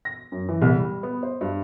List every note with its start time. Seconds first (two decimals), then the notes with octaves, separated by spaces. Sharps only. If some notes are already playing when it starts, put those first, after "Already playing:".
0.05 A#6
0.32 F#2
0.49 E3
0.62 C2
0.76 G3
1.03 B3
1.23 C5
1.41 G2